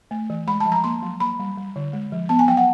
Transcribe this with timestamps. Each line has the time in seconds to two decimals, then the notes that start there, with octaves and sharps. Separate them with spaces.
0.11 A3
0.30 E3
0.47 G#3 B5
0.60 A5
0.65 F3
0.72 A#5
0.84 A#3 C6
1.03 F#3
1.20 A#3 B5
1.39 G3
1.58 G3
1.76 D3
1.93 G#3
2.12 F3
2.29 B3 A5
2.39 G#5
2.48 F#3 G5
2.57 F#5